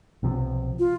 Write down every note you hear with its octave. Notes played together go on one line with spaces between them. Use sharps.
B1 C3 F3
F4